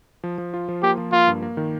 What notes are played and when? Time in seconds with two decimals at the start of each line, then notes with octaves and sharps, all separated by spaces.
0.24 F3
0.38 F3
0.54 F4
0.69 F3
0.83 A#3 G4
0.98 F3
1.12 A#3 F4
1.27 G2
1.42 A#3
1.57 D#3